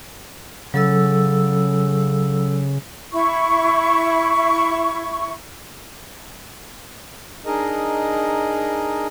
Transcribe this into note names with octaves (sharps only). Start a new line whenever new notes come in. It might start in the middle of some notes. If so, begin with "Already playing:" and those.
C#3 F#3 A4 E6
E4 C#6
D4 D#4 G#4 A#4 D#5